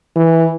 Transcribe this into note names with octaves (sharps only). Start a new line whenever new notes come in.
E3